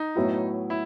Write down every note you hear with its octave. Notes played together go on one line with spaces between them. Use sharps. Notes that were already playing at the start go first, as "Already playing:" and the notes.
Already playing: D#4
A2 F#3 B3 E4
E4